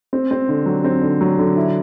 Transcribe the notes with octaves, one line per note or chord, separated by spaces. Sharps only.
C4
C4
D3
F#3
C4
D3
F#3
D3
E4